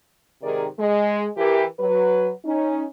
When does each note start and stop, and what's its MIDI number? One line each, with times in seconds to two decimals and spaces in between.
0.42 0.65 44
0.42 0.65 48
0.42 0.65 51
0.42 0.65 68
0.42 0.65 70
0.42 0.65 74
0.79 1.26 56
1.36 1.63 52
1.36 1.63 67
1.36 1.63 70
1.79 2.29 54
1.79 2.29 71
2.44 2.85 61
2.44 2.85 63